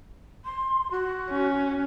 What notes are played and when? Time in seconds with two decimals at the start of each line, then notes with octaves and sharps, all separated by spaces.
0.45 C6
0.91 F#4
1.30 C#4